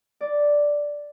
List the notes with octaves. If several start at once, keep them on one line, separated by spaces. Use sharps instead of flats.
D5